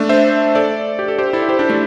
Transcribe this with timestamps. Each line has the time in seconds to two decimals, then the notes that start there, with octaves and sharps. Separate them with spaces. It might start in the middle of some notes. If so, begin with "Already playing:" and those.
Already playing: A3 D4
0.09 C5 E5
0.55 A4 D5
0.99 G4
1.08 A4
1.19 G4 C5
1.33 E4 A4
1.49 G4 C5
1.59 D4 G4
1.70 A3 D4